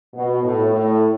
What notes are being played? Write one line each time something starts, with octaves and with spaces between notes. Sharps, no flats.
B2
A2
A2